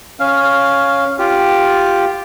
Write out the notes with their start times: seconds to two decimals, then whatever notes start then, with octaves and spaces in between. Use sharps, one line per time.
0.20 C#4 F5
1.19 F4 G4